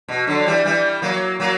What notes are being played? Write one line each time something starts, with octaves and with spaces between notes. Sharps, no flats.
B2
D3 F#3
E3 G3
E3 G3
F#3 A#3
F#3 A#3